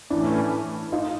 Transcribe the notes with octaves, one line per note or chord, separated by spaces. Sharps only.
A2 E3 A3 C#4 D4 E4
D#4 F4